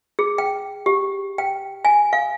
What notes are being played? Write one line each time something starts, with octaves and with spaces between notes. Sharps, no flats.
G#4
G5
G4
G5
G#5
F5